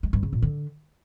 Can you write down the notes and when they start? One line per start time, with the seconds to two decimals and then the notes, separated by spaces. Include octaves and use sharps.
0.03 G#3
0.13 G2
0.23 C#3
0.33 A#2
0.42 D3